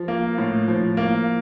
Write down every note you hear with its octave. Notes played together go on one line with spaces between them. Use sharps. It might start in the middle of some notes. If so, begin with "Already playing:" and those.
Already playing: F3
A#3
A2
F3
A#3